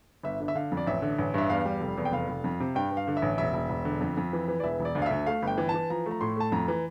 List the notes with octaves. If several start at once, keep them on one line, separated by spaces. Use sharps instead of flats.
G1 E5
D3
E5
D3 F5
F2
D5
A1 E5
D3
A1
G2 E5
E2 F5
G3
F1
E2
G5
F1 F5
F1
F2
C3
G2 G5
G2
F5
D3
E5
A1
E1 E5
E1
E1
D3
F2
F2
E3
E3
D5
E1 E5
E1
D5
D2
F5
D2 E5
A3 F5
G1 G5
E3
A5
E3
F3 A#5
A3 A#5
A2 C6
A3 A5
F2 A#5
E3